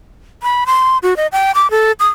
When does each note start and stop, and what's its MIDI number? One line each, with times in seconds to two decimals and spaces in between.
0.43 0.64 83
0.66 0.98 84
1.03 1.17 66
1.17 1.27 75
1.32 1.52 79
1.55 1.70 86
1.71 1.92 69
2.00 2.08 87